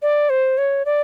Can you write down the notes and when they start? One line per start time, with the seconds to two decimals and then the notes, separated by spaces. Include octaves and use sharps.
0.02 D5
0.30 C5
0.58 C#5
0.86 D5